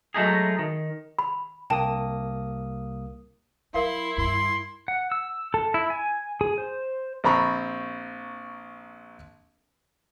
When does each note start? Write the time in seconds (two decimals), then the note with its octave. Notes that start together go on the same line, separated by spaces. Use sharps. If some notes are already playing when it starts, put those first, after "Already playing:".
0.14 F#3 G#3 A3 D#4 G#4
0.59 D#3
1.19 B5
1.70 C2 A#3 G5 A5 D#6
3.74 F#3 E4 A#4 E5 F5 C6
4.18 G2 D#3 C6
4.88 F#5
5.12 E6
5.54 A4
5.74 E4
5.90 G#5
6.41 G#4
6.58 C5
7.24 A#1 C4 A#5 B5 C#6